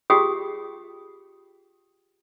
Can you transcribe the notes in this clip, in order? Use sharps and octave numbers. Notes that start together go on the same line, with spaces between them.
F4 G4 G#4 G5 D#6